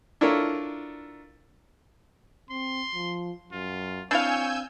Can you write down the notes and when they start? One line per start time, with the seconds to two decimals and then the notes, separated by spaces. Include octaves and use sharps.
0.21 D4 E4 F4 A4 A#4 C#5
2.50 C4 C6
2.94 F3
3.52 F#2 F4
4.11 C4 D4 E4 C#5 F5 G#5 E6 G6